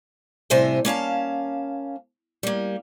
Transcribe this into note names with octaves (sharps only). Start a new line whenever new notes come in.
A2 C3 G3 C5 E5 G#5
A#3 C#4 F5 A5
G3 A#3